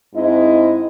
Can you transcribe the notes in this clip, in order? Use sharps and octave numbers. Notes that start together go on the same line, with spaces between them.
G#2 C4 E4 D#5